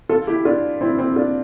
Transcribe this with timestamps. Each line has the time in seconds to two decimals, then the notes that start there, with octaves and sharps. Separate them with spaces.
0.09 F4 A4
0.27 E4 G4
0.45 D4 F4
0.81 C4 E4
0.98 C4 E4
1.16 D4 F4